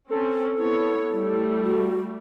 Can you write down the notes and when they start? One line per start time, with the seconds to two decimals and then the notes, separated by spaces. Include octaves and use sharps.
0.10 C4 C#4 A4
0.57 B3 E4 C#5
1.14 G3 A3
1.63 F#4